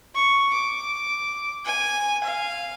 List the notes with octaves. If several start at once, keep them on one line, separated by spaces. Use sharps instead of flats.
C#6
D6
G#5
F5